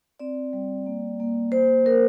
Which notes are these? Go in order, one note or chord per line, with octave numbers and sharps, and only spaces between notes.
C4 D5
G3
A#3
A#3
A#3 C5
A#3 A#4